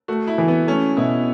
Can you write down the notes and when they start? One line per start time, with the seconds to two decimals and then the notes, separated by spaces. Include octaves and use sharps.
0.08 A3 F#4
0.27 E4
0.38 E3
0.48 B3
0.67 A3 C#4
0.97 B2 E4